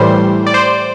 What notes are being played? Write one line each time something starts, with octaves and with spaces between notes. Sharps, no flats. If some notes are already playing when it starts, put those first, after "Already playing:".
Already playing: A2 E3 G3 C5
D5
C5